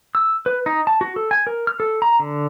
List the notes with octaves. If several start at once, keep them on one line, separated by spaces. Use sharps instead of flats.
E6
B4
D#4
A5
F#4
A4
G#5
A#4
F6
A4
A#5
D3